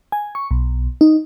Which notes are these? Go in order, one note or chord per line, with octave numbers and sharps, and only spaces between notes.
G#5
C#6
B1
D#4